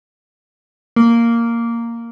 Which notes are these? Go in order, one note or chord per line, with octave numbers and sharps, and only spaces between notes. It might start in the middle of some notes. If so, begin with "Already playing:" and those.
A#3